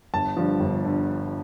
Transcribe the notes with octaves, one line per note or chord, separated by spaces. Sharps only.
G1 A5
G2 D3 F3
G1
D3